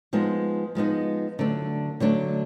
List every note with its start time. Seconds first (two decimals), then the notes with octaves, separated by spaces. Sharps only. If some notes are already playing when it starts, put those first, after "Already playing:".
0.13 F3 G#3 B3 D#4
0.75 F3 G#3 B3 D#4
1.39 D3 F#3 A3 D4
2.00 D3 F#3 A3 D4